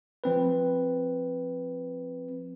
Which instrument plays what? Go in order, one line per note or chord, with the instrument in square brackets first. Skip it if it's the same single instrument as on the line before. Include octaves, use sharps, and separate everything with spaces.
[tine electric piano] F3 C4 B4